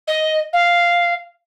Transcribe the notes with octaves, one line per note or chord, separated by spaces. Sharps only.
D#5
F5